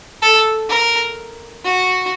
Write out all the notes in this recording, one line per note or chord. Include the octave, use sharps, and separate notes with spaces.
A4
A#4
F#4